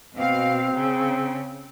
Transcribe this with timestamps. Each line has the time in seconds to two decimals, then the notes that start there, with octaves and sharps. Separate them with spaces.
0.15 B2 C4 F5
0.73 C#3